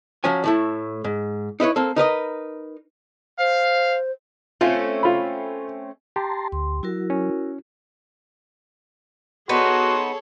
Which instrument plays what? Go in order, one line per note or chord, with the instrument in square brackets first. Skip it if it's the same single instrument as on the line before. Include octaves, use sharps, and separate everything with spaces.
[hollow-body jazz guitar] F3 F#3 C#4 G#5
A2 A3 E4
G#2
D#4 E4 B4 C#5
A#3 C4 A4
D#4 A#4 B4 D#5
[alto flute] C5 [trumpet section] F5
[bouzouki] A3 C4 C#4 [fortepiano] F4
[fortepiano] F4 B5
[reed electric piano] G4 [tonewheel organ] A5 A#5 C6
[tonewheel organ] D2 [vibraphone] C6
[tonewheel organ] F#3 [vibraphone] E4 F#4 A#4
[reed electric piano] C#4
[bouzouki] B3 D#4 [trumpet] F#4 [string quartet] G#4 A4 C#5 [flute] C6